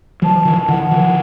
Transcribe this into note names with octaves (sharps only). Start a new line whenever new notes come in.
E3 F#3 A5
D#3 F3
D3 E3 F#5
D#3 F3